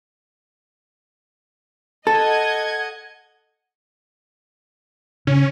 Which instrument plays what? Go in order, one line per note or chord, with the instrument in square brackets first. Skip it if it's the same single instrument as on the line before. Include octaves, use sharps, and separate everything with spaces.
[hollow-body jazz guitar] A4 [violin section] D#5 F#5 G#6
[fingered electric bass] C#3 [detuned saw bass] C#4